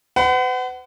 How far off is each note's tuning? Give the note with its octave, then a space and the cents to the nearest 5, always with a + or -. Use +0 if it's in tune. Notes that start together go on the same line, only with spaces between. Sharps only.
B4 +45 F#5 +20